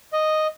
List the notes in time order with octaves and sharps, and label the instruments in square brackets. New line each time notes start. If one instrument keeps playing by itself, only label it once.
[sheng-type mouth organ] D#5